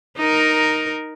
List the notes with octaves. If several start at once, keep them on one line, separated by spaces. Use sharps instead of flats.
D#4 A#4